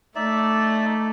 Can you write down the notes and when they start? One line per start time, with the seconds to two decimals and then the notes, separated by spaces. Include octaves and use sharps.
0.16 A3 D#4 D5 E5